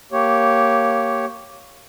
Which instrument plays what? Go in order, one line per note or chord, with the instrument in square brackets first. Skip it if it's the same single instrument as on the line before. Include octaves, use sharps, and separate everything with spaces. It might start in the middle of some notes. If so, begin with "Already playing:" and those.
[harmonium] A#3 G4 C#5